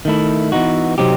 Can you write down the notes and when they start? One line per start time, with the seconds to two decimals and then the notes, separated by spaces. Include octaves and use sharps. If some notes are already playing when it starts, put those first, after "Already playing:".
0.05 D#3 A3 E4
0.52 E3 B3 D#4 F#4
0.98 C3 F#3 C4 D#4 G4